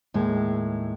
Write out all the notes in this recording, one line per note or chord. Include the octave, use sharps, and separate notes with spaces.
D#2 A2 G#3